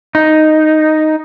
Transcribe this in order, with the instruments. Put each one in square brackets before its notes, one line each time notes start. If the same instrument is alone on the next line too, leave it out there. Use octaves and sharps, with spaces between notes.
[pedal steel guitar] D#4